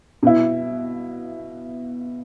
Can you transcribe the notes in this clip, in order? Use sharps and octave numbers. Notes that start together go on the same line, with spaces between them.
B2 B3 E4